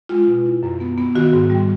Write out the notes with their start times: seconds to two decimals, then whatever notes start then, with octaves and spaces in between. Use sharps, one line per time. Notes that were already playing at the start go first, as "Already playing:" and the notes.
0.09 G#3 F4
0.27 B2
0.46 E4
0.63 F#2
0.80 B3
0.98 B3
1.15 D#3 F#4
1.33 G#2
1.50 G3